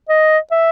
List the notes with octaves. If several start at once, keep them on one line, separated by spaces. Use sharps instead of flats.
D#5
E5